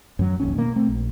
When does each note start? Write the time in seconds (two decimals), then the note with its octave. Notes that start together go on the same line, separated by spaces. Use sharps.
0.19 F#2 F#3
0.40 D1 A#1 D#2 C#4
0.56 B2 A#3
0.76 A3 C4
0.89 A#1